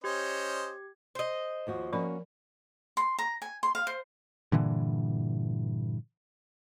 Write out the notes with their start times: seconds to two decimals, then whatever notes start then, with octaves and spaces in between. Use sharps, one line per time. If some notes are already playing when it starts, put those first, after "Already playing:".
0.04 C#4 G4 C5 D#5 G#6
1.15 C5 D#5
1.67 D#2 F3 F#4
1.93 F3 A#3 C#4 F#4 A#4 B5
2.97 C6
3.18 A#5
3.42 G#5
3.63 C6
3.75 F5
3.87 C5
4.52 G2 A#2 D3 E3